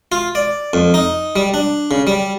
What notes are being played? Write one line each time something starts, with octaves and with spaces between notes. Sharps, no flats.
F4
D5
F2
D#4
G3
D4
C#3
G3